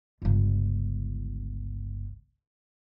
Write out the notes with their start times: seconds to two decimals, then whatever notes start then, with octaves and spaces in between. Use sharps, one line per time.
0.22 G1 C#2